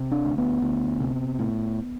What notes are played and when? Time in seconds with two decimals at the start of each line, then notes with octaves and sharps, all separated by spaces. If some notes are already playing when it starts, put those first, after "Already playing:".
Already playing: C3
0.11 D4
0.25 D2
0.38 B3
0.62 D2
1.00 C3
1.39 A2